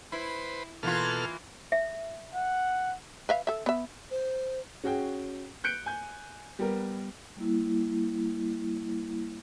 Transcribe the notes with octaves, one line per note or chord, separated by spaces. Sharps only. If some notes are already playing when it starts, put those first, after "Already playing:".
E4 B4 C5
B2 E3 A#3 F4 A4 F6
E5
F#5
B4 E5 F5
A4 E5
B3 E5
C5
C#4 F#4 G#4 G5
F#6 G6 C#7 D7
G#5 G6
G3 B3 A#4
G3 A#3 E4